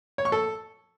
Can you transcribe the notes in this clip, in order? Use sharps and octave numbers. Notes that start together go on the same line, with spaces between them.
C#5
C#6
A4